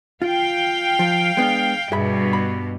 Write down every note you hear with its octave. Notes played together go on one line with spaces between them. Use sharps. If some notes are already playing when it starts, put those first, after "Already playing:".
F4 F5 G5
F3
G#3 B3 D4
G2 B2 G#4 E5 B5
B5